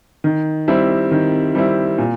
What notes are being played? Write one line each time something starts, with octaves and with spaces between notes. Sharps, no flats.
D#3
G3 C4 E4
D#3
G3 C4 E4
A#2